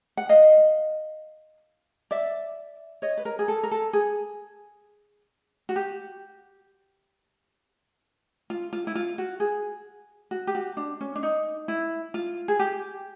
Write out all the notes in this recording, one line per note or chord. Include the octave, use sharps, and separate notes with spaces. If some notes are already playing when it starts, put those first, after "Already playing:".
F#5
D#5 F5
D5 E5
C#5 D#5
B4
A#4
G#4
A4
A#4
A4
G#4
F#4
G4
F4
F4
E4
F4
F#4
G#4
F#4
G4
F#4
D4
C#4
D4
D#4
E4
F4
G#4
G4